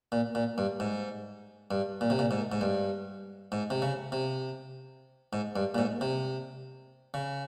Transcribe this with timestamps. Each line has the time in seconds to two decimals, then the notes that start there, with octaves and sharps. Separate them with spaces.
0.12 A#2
0.35 A#2
0.58 G2
0.80 G#2
1.71 G2
2.01 A#2
2.10 C3
2.19 A#2
2.31 G#2
2.52 G#2
2.61 G2
3.52 G#2
3.70 C3
3.82 C#3
4.12 C3
5.33 G#2
5.56 G2
5.75 A#2
5.78 G#2
6.01 C3
7.14 C#3